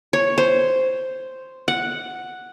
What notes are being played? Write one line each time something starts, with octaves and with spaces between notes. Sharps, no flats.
C#5
C5
F#5